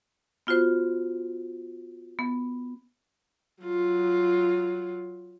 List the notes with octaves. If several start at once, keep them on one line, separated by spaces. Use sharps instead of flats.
B3 F4 F#4 C5
B3
F#3 F4